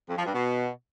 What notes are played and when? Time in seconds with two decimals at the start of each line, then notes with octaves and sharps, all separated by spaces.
0.08 F2
0.16 F3
0.24 G2
0.33 B2